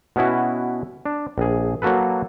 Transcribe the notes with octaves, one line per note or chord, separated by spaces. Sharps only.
B2 B3 C#4 E4 F#4
D4
A#1 G#4
F#3 A#3 F#4 A4 B4